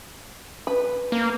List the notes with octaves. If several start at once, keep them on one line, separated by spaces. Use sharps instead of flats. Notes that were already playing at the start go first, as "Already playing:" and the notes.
B4
A#3